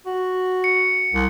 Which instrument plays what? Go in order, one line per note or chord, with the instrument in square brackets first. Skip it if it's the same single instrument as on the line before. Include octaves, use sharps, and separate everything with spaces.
[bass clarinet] F#4
[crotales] C#7
[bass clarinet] C2